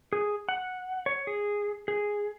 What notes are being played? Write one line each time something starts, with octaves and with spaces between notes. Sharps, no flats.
G#4
F#5
C#5
G#4
G#4